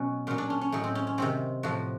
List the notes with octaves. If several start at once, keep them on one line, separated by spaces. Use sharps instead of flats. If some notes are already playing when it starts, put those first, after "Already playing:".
Already playing: B2 F#3 C#4
A#2 F#3 C#4
D4
C#4
C#4
A2 F#3 D#4
C4
C#4
C#4
C3 D#3 F#3 C4
A2 F3 F#4